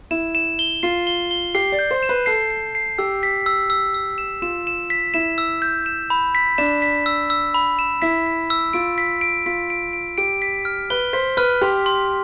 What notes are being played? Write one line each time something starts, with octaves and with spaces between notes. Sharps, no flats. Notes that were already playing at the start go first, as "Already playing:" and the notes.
E4 E7
E7
G7
F4 C7
G7
G7
G4 C7
D5
G6
C5
E7
B4
A4 C7
C7
C7
G4 E6
B6
E6
E6
E6
E7
F4 E7
E7
B6
E4 E7
E6
G6
E7
B5
B6
D4 E7
B6
E6
E6
B5
E7
E4 B6
B6
E6
F4 D7
B6
D7
F4 B6
D7
D7
G4 D7
B6
F6
B4 G7
C5 B6
B4 F6
G4 C6
C6